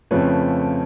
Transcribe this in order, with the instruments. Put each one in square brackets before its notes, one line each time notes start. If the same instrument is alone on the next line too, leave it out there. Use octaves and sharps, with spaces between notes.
[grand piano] F2 C#3 F3 A3 B4 C#5